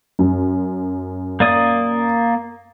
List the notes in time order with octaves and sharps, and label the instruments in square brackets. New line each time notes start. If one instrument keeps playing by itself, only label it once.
[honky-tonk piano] F#2
[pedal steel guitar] A#3 D5 D#6